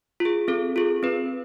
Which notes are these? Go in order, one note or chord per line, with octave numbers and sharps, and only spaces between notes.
F4
G#4
C4 A4
F4 G#4
C4 B4